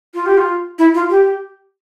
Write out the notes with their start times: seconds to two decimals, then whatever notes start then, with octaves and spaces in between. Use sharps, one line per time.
0.15 F4
0.26 G4
0.37 F4
0.79 E4
0.95 F4
1.10 G4